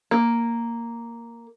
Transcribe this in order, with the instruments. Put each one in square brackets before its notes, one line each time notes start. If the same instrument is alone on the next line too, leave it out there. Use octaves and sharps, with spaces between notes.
[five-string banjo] A#3